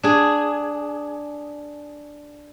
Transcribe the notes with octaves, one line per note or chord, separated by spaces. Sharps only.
D4 G#4